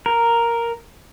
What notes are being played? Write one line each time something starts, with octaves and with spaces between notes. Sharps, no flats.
A#4